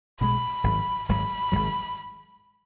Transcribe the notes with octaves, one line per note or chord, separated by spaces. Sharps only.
B1 B2 G#3 B5
G#1 G#2 F#3
G#1 G#2 F#3 B5
G#1 G#2 F#3